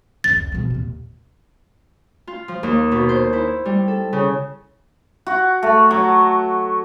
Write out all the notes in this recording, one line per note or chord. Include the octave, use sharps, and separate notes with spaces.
F1 C#2 A6
B2 F3
D#2 A#2
F4
F3
D#2
B2
C5
E4
G3
A4
C#3
F#4
A3
F#3